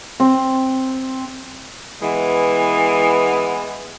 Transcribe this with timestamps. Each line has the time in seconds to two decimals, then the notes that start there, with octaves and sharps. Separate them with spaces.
0.20 C4
2.02 E3 G#3 B3